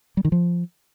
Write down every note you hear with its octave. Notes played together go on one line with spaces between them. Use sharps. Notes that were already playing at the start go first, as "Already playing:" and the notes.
G3
D#3
F3